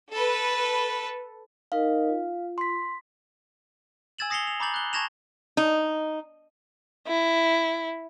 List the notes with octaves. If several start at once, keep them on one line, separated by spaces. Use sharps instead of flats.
A4 B4
D#4 A#4 D#5 F5
F4
C6 B6
G#5 E6 G#6 A6 E7 F#7
D#6 A#6 C7 C#7 F7 G7
F7
A#5 B5 D6 G6 A6 F#7
F#6 G7
A5 C#6 G#6 A#6 E7 F7
D#4
E4